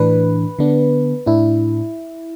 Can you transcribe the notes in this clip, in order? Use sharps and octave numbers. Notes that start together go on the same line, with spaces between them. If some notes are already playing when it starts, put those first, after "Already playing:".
Already playing: A2 E3 D4 B4
D3 B3 D4
A2 D4 E4